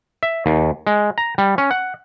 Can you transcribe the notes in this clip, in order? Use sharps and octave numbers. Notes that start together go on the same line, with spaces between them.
E5
D#2
G#3
A#5
G3
C#4
F#5